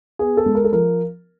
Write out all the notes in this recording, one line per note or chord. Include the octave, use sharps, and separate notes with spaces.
B3 G#4
A4
G#3
A#4
A4
F3 A#4